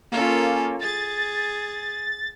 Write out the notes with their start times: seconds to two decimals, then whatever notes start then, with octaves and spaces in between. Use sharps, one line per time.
0.12 A#3 C#4 F4 A4
0.80 G#4 A6